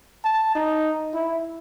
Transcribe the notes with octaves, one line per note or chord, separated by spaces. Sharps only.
A5
D#4
E4